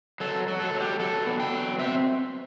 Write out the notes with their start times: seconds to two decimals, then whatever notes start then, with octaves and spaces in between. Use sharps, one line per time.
0.20 F#3 A4
0.48 F#3
0.60 A4
0.74 F#3
0.80 G4
0.99 F#3 A4
1.26 B3
1.40 G5
1.52 F#3
1.79 C4 E5